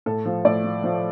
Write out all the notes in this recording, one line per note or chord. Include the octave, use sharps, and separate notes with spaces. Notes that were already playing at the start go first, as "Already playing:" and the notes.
A2 A4
F3
A2 D5
F3
F3